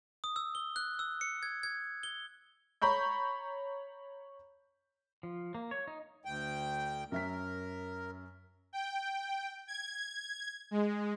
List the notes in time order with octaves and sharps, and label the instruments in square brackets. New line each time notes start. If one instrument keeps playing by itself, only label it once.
[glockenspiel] D#6
E6
G7
F#6
E6
C#7
G#6
G#6
G7
[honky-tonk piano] C#5 A#5 B5 C#6 G6
[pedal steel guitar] F3
A#3
C#5
D#4
[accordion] D2 G5
[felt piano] F#2 E5 B6 [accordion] A#4
[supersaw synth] G5
G#6
G#3